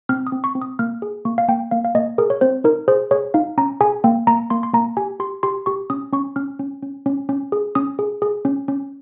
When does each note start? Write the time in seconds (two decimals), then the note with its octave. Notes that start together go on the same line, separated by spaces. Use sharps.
0.09 C4 F6
0.27 D#6
0.32 C4
0.44 C#6
0.55 C4
0.62 D#6
0.79 A#3 F6
1.02 G#4
1.25 A#3 C#6
1.38 F5
1.48 A#3 G5
1.71 A#3 F5
1.85 F5
1.95 A#3 D#5
2.18 G#4 A#4
2.30 C#5
2.41 C4 C5
2.64 D#4 A#4
2.88 G#4 C5
3.11 G#4 C#5
3.34 D#4 F5
3.58 C#4 A#5
3.81 G#4 G#5
4.04 A#3 G5
4.27 A#3 A#5
4.50 A#3 C6
4.63 C6
4.73 A#3 A#5
4.97 G4 G#5
5.20 G4 C6
5.43 G4 C6
5.66 G4 C#6
5.90 C#4 D#6
6.13 C#4 C#6
6.36 C#4 F6
6.59 C#4
6.83 C#4
7.06 C#4
7.29 C#4
7.52 G#4
7.75 C#4 D#6
7.99 G#4
8.22 G#4
8.45 C#4
8.68 C#4